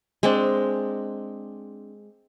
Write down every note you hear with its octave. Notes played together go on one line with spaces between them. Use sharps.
G#3 C4 D4